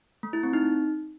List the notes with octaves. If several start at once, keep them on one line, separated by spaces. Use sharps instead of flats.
A3
E4
C4
D#4